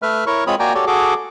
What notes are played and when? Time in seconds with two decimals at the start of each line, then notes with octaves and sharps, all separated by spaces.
0.02 A3 B4 E5 F6
0.27 E4 A#4 C#5 C#6
0.47 G#3 C4 F4 C#5 B5 D#6
0.60 A#3 F#4 D5 G5 G#5 A#5
0.75 F#4 G4 A4 C#5 D5
0.87 F#4 G#4 A4 D6